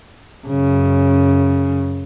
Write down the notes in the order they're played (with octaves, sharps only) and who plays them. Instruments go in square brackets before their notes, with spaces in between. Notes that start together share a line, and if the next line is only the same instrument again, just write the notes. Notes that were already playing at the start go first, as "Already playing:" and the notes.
[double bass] F#2 C#3